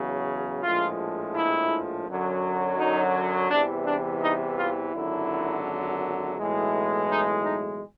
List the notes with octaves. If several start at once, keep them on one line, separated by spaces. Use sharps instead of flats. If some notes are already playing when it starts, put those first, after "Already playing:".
Already playing: E2 C#3 F#3
A#1 A2 F3 G#3 F4
E4
F#2 D3 F#3
D#4
E2 C3 E3 G3 D4
D4
D#4
F4
G#1 F#2 D3 F#3 E4
B1 A2 E3 G#3
D#4
D#4